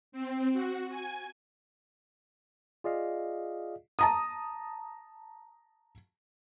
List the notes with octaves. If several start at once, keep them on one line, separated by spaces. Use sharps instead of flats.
C4
F#4
G#5
F4 G#4 D5 D#5 F5
A5 A#5 D#6